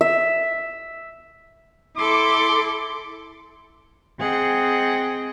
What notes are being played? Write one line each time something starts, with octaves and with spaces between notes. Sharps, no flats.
E5
E4 A4 C6 D6
C4 G#4 D#5 F#5 G5